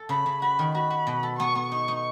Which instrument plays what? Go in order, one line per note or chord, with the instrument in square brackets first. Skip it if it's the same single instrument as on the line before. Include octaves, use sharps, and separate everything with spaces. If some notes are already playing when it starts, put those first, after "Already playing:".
Already playing: [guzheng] A4
[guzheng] C#3 [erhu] B5
[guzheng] C#3
[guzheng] F#4 [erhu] B5
[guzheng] D#3
[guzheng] F#4 [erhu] B5
[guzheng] F#4
B2
A4
[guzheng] B3 [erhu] C#6
[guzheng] B3
[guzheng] D#4 [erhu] C#6
[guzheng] D#4